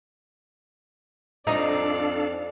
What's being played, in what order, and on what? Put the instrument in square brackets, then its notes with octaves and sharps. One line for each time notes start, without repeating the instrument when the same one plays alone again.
[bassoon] F2 [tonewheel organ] D4 A4 F5 [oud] D#4 [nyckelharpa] D5